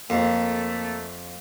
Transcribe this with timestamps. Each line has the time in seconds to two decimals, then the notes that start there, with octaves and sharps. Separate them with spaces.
0.10 F2 A3 A#3